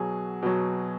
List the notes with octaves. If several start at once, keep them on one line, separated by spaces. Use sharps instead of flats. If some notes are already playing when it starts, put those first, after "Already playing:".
Already playing: B2 F#3 G#4
B2 F#3